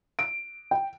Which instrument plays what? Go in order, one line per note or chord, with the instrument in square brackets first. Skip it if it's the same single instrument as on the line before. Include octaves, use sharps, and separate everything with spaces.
[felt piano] D7
G5